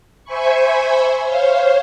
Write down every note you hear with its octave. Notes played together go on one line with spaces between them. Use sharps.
C5 E5 G#5 B5 C#6
C5 C#5 F5